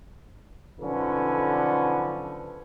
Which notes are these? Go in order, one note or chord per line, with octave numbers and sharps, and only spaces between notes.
B1 D3 F3 C#4 B4